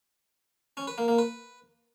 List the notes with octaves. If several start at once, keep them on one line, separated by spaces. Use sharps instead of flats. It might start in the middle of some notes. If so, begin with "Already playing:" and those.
C#4
B4
A#3
A#3
B4